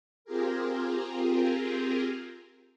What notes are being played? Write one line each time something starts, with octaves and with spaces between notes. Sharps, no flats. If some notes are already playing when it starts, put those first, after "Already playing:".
C4 F4 G4 G#4 A#4